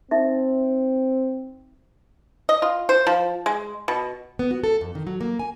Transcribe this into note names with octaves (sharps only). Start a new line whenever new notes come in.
C4 D#4 E5
D#5
F4
C5
F3
G#3
B2
B3
F#4
A4
F2
D#3
F#3
A#3
G#5